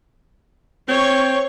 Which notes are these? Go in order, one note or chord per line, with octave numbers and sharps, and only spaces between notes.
C4 C#5